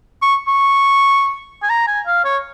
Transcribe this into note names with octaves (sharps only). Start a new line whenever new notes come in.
C#6
C#6
G#5
A#5
G#5
F5
C#5